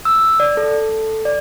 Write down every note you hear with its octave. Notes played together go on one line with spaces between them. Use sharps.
E6
D5
A4
D5